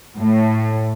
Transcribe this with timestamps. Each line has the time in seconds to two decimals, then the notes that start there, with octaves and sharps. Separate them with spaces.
0.18 A2